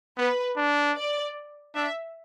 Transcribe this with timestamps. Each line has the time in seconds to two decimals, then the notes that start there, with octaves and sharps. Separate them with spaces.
0.18 B3 B4
0.57 D4
0.97 D5
1.75 D4 E5